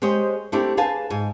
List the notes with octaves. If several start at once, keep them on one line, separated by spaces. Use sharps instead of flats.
G#3 G4 C5 C#5 D#5
A3 C4 D4 E4 G4
G#4 B4 F5 G#5 A5
G#2 G#5